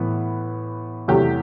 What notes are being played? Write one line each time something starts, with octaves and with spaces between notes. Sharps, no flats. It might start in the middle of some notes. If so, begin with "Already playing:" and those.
Already playing: A2 E3 B3
E2 C3 F#3 A3 G4